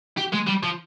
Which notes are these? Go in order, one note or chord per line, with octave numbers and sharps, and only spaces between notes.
G4
G#3
G3
F3